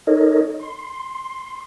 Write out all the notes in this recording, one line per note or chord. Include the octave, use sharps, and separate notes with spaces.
D#4 A4 A#4 C#5 D#5
C6